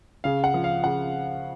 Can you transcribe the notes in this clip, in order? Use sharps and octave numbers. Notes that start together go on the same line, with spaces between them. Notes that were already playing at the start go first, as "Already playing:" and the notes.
C#3 F5
F#5
F3
F5
C#3 F#5